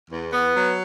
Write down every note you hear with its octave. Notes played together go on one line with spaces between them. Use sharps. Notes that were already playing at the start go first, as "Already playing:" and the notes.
E2
B3
F#3